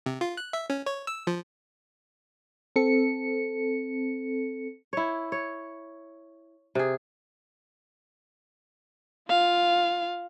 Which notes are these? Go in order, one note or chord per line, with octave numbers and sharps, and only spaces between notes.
C3
F4
F#6
E5
C#4
C#5
E6
F3
C4 A4 C#7
E4 C#5
C#5
C3 G#4
F4 F5